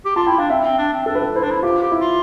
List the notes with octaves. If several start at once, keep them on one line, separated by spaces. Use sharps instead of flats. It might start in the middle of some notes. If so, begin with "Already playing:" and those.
G4
F4 A5
E4 G5
D4 F5
C4 E5
C4
D4
C4
D4 A4
B4
A4
E4 C5
D4
E4
F4 G4
G4
E4
F4